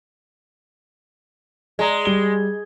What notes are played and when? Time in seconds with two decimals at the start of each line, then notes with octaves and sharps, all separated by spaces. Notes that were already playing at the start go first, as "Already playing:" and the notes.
1.79 G#3 D5 A#5
2.05 G3 G7